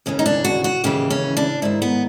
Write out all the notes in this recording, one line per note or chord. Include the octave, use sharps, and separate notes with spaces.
D#2 C#3 E3 C#4
D#4
D4
F#4
F#4
D#2 C#3 E3 G4
C#4
D4
G#2 D#3 E4
B3